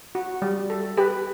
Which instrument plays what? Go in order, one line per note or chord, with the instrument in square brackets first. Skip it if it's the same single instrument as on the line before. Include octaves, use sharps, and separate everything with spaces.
[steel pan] F#4
G3
A4
[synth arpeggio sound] G4 [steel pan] B4